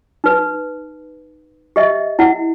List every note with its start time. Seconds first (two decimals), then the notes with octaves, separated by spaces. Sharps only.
0.24 D#4 B4
1.76 G4 D#5 E5
2.19 E4 F#5